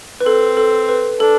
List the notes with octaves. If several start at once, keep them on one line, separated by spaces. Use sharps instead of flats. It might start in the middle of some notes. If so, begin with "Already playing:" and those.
B4
C4 A4
A4
B4
D4 A4